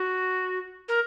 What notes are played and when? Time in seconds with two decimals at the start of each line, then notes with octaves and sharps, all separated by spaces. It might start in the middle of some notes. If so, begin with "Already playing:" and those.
Already playing: F#4
0.88 A#4